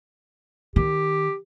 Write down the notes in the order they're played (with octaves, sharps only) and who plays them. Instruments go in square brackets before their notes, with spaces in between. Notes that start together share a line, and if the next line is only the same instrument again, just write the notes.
[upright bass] D#3 [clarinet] G4